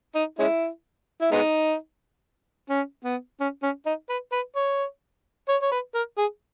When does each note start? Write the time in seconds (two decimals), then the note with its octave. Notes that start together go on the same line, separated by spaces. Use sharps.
0.15 D#4
0.39 G#3 C#4 E4
1.21 E4
1.32 G#3 B3 D#4
2.70 C#4
3.04 B3
3.40 C#4
3.62 C#4
3.86 D#4
4.09 B4
4.32 B4
4.56 C#5
5.49 C#5
5.62 C#5
5.71 B4
5.94 A#4
6.18 G#4